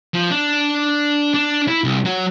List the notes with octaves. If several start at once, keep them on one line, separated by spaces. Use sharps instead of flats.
F3
D4
D4
E4
C2
F#3